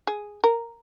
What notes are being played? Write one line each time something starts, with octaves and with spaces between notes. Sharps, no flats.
G#4
A#4